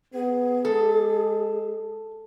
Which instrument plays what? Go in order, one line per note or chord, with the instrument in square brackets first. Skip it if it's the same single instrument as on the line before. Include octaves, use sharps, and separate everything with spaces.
[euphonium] B3 [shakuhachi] G#4
[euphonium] G#3 [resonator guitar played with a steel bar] A4